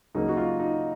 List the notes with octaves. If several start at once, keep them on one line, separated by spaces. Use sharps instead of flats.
C#3 F#3 A#3 D#4
F#4
F4
D#4